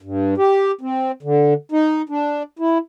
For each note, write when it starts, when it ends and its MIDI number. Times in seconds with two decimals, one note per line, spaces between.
0.02 0.34 43
0.38 0.72 67
0.81 1.12 60
1.23 1.54 50
1.72 2.02 63
2.09 2.43 62
2.59 2.78 64